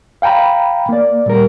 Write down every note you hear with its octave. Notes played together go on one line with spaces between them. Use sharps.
F5 G5 G#5 A#5 B5
A#3 D5
A#2 G3 A#4